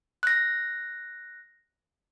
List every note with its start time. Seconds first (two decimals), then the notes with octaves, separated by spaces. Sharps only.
0.23 F#6 A#6